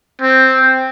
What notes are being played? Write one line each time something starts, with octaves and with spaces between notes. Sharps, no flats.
C4